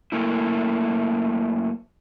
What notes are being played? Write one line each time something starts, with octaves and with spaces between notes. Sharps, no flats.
F#2 A3 A#3 E4